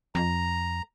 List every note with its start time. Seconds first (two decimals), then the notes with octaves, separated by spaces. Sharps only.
0.15 F2 A#5